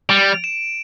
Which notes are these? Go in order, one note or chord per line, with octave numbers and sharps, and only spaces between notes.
G3 D7
E7